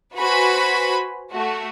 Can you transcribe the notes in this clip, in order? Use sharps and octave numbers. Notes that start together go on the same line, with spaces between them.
F#4 B4 C5 G#5 B5
A3 F#4